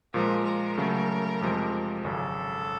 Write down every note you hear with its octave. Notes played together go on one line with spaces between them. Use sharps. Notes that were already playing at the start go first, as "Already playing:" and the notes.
A#2 F3 G#3 A#4
A#4
C#3 F#3 A3
F2 C3 F3 G#3
G#1 F#2 C#3 A4